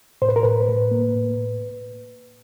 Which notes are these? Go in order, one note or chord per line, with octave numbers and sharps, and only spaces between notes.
A2 C5
B4
A#4
A2 B4
A2
A#3
A2